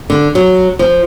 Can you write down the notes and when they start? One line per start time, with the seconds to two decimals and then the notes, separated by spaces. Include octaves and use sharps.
0.10 D3
0.35 F#3
0.79 F3